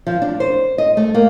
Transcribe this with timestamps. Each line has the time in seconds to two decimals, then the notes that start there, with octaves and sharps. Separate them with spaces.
0.07 F3
0.22 D4
0.40 C5
0.78 D#5
0.97 A3
1.14 A#3